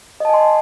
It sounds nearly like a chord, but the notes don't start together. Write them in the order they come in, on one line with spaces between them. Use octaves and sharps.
D#5 A5 G#5 C6